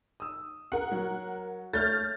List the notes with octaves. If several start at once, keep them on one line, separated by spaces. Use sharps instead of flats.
D#6 E6
A#4 F#5
F#3
A3 C#5 F6 G6 A6